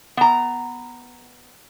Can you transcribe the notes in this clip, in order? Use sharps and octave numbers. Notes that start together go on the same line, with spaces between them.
B3 A#5